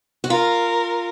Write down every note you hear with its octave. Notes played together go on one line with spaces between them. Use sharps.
F#4
F4 A#4